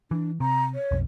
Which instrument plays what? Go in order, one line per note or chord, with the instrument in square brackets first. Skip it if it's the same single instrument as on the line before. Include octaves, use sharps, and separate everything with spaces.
[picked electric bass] E3 [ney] D4
[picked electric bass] C3 [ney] A#5
[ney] C#5
[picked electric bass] B1 F2